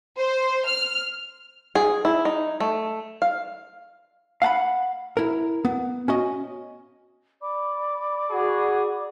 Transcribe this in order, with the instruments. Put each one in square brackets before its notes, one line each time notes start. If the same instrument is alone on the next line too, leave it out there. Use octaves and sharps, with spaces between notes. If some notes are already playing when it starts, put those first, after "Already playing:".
[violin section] C5
F6
[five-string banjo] G#4
E4
D#4
A3
F5
[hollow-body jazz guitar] F5 F#5 A5 B5
E4 A#4
B3
C#4 F#4 D#5
[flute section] D5 B5 D6
[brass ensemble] F#4 G#4